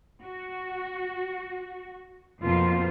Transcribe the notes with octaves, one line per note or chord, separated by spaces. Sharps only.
F#4
F2 B2 A#3 F4 C5